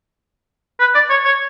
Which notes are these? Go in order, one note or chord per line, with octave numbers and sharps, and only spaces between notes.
B4
D5
C#5
C#5